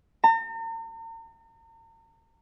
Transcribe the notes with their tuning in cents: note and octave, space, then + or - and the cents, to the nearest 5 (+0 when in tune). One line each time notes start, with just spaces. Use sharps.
A#5 -45